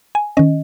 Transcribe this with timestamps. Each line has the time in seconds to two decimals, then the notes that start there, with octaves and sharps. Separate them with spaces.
0.15 G#5
0.37 D#3 C#4 D#5